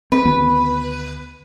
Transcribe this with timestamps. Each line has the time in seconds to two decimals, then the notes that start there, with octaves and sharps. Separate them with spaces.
0.12 C4 B4
0.25 D2 D#3 B3